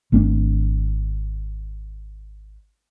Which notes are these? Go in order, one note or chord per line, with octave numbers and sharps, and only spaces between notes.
G#1 A3 C4 D4